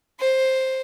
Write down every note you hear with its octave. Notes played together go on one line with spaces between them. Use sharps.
C5